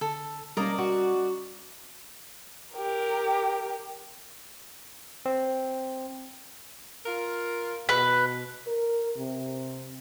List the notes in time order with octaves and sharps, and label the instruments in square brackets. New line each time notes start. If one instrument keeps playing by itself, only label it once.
[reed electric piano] D3 [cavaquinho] A4
[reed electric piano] G3 C#4 [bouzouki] A#3 [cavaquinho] A#4 D5 D#5
[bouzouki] F#4
[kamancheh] G4 A#4
[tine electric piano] C4
[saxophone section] F4 A#4
[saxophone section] B2 [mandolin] B4
[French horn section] A#4
C3